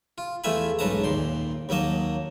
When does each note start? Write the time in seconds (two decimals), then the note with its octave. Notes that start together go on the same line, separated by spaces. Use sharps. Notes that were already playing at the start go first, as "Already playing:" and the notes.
0.18 F4
0.44 E2 A3 F4 E5 G#5 B5
0.79 B1 G#2 C#4 B4 A5 A#5
1.04 D#2 A#2 C6
1.69 D#2 F#3 A#3 D#5 A5